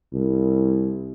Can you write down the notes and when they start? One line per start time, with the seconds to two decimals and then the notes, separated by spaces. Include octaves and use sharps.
0.13 C2